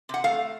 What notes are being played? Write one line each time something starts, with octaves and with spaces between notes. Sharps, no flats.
C3 F#5
A3 F5